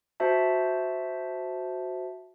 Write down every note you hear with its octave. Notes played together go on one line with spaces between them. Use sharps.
F#4 C5 E5 A5